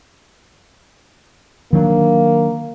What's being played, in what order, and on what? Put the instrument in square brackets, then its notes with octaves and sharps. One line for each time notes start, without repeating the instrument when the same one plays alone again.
[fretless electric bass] D#3 F#3 D4 [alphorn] A#3